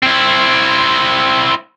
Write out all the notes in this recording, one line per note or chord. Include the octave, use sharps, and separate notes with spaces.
C4 E4